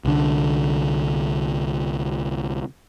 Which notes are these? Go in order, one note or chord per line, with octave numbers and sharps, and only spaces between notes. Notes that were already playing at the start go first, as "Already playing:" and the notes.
C2 D3